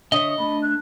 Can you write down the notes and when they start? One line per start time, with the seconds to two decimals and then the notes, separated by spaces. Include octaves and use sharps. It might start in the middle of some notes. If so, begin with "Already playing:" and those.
0.12 D3 C#5 D#5 E5 D#6
0.38 A3 D4 B5
0.63 F#6